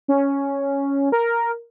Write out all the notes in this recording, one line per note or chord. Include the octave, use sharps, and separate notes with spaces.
C#4
A#4